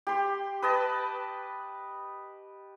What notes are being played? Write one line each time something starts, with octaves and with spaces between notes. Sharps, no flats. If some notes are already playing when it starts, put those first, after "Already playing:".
G4 C6
B4 D#5 A5